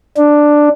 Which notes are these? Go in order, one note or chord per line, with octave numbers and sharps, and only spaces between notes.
D4